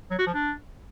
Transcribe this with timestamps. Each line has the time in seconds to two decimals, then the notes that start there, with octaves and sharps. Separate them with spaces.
0.11 F#3
0.18 F#4
0.26 F3
0.34 D4